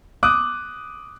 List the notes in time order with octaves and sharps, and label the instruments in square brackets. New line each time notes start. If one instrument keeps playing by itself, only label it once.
[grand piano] D6 D#6 F#6